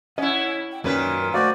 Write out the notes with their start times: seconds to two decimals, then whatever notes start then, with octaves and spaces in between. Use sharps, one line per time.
0.18 C#4 E4 D#5 F#5
0.72 G5
0.84 F#2 A#2 D#3 F#3 C#4 A#4 B4
1.34 A3 F#4 C5 D5 D#5 F5